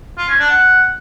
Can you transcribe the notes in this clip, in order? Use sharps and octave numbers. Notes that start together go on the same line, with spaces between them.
F4
C#4
D4
F#5